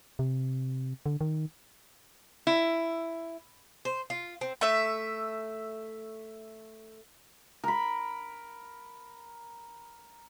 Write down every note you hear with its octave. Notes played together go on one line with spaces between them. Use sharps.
C3
D3
D#3
E4
C5
F4
C4
A3 E5
A#4 B5